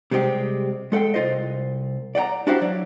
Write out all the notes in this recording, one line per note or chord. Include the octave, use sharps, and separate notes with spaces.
C3 G3 G#3 C4 G4
G#3 A4 F#5 G5 C6
C2 F4 C5 D#5
D5 F#5 G5 A#5
D4 E4 F#4 G4 C5 F5
F#3 C#5 D5